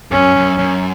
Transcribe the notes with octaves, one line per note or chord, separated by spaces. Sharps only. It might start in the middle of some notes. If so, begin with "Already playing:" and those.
F#2 C#4
F#2
F#2